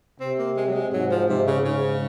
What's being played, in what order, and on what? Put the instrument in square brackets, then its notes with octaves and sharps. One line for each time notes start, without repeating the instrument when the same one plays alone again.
[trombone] C3 [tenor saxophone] C4
[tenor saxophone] A#3
G#3
F#3
G#3
[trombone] G#2 [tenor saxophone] F#3
[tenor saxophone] F3
[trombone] G#2 [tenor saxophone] C3
[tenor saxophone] C#3
[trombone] G#2 [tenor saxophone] C#3